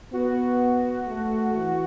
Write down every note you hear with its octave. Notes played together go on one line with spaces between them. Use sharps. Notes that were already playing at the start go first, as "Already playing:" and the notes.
B3 F#4
A3
E3